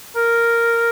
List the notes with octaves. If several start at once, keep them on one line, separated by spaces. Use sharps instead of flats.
A#4